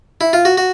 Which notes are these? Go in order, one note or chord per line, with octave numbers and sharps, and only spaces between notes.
E4
F4
F#4
F#4